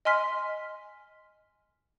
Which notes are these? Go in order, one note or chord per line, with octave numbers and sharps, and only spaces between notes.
D#5 G#5 C6 F6 B6